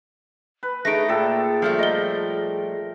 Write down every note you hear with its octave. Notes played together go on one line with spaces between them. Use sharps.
B4
A3 D#4 G#4 A#6 D7
A#2 G#4 A4 G5
F3 G3 A3
A#4 D#5 G7